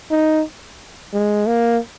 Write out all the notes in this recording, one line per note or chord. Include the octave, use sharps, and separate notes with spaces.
D#4
G#3
A#3